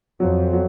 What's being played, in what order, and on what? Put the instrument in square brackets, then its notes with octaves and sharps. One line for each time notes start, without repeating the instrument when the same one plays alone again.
[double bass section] F2 [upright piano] F#3
[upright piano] F#3